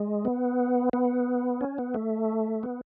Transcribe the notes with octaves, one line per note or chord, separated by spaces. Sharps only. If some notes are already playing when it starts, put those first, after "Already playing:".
Already playing: G#3
B3
B3
C#4
B3
A3
B3